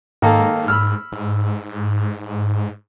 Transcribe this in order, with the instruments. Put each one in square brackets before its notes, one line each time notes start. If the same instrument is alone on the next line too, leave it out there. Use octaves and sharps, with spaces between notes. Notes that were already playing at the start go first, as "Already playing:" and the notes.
[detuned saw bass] G#2 [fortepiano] D#3 A#3 A4
[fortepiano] B5 E6 F6
[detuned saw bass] G#2